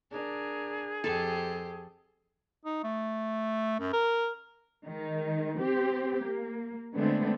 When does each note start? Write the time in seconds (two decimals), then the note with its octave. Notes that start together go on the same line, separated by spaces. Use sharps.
0.11 D4 G#4 A#4
1.04 F2 G4 A4 C5
2.65 D#4
2.84 A3
3.79 F#2
3.93 A#4
4.86 D#3 G#3
5.58 C4 G4
6.23 A#3
6.94 D3 G#3 A3 B3 C4 D4